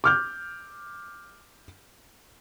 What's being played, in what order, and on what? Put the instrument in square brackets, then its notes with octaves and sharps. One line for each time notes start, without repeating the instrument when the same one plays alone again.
[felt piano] D6 F6 G6